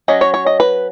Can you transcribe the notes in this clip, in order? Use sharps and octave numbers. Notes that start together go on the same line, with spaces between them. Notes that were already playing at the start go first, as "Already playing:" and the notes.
F#3 C#4 D#5
C#5
C#5
D#5
B4